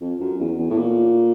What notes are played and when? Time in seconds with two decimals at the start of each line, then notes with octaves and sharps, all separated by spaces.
0.01 F2
0.20 F#2
0.40 E2
0.59 E2
0.70 A2
0.78 A#2